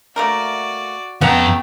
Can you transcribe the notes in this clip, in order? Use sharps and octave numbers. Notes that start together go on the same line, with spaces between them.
A3 A#3 F#4 A#4 D5
F2 C#3 A3 B3 F#5 G5 A5 A#5